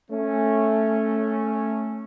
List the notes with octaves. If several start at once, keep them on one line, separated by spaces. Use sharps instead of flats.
A3 C#4